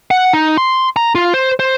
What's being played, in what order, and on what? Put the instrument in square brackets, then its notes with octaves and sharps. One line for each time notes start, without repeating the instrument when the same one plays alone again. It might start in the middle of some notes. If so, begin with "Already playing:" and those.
[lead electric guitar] F#5
D#4
C6
A#5
F4
C5
C5